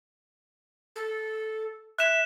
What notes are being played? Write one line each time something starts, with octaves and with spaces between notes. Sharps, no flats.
A4
E5 F#6 E7